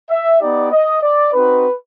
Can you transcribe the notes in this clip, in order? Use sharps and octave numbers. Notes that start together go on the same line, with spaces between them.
E5
B3 D#4 G4 D5
D#5
D5
C4 D#4 F#4 B4